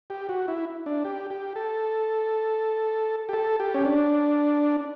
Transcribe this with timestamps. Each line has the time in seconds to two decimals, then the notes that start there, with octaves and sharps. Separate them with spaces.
0.10 G4
0.29 F#4
0.48 E4
0.86 D4
1.05 G4
1.30 G4
1.55 A4
3.29 G4
3.33 A4
3.60 G4
3.74 C#4
3.85 D4